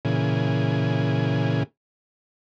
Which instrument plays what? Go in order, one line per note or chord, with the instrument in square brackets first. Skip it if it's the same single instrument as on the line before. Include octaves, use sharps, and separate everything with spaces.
[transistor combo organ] A#2 C#3 E3 G#4